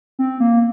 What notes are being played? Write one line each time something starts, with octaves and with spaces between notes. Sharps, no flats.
C4
A#3